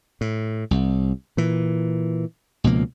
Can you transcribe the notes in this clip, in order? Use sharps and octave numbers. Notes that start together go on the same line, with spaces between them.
A2
C2
A#2 E3
C#2 B2 F3 A#3